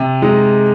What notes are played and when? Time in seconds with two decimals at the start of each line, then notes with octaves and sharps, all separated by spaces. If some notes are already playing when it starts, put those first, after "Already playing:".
Already playing: C3
0.22 G#3 D#4